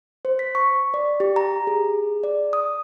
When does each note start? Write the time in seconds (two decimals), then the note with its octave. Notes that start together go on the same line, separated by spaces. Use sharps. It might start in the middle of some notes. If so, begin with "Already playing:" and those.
0.25 C5
0.39 B6
0.55 C#6
0.94 D5
1.20 G4
1.36 A#5
1.67 G#4
2.23 D5
2.53 D#6